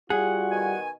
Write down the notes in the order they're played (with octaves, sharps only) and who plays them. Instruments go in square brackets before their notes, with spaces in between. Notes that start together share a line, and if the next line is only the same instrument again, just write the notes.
[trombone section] G3 F4 F#4 [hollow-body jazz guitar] G#4 [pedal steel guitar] F#5
[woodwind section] B2 D#3 G#5